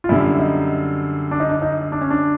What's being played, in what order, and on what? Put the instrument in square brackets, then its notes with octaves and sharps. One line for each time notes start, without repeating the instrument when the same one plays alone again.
[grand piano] F4
[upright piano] F#2 D3 G3 [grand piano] E4
[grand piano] E4
D#4
D4
D#4
D4
D#4
D4
C#4
D4